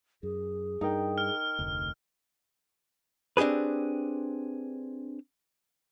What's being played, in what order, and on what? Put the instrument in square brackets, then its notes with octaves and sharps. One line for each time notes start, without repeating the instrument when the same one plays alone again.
[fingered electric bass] F#2 [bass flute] G#4
[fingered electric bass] G2 [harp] D#4 A#4 G5
[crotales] F6
[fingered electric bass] F1 D2
[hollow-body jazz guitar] C4 D4 G4 G#4 B4